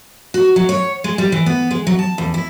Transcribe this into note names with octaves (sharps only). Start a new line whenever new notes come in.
F#4
F#3
C#5
G#3
G3
E3
B3
G#3
F#3
A5
E2
E4